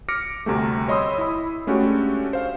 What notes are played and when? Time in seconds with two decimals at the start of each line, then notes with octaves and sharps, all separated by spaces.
0.08 D6 F6 A#6 C#7 D7
0.46 D2 C3 G3 A3
0.88 C#5 D#5 B5 C6 D#6 E6
1.18 E4 B5
1.67 G#3 A3 C#4 D4 F#4 G4
2.33 C5 F5